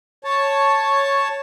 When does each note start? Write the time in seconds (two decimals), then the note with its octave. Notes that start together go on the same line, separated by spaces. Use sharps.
0.24 C#5 A5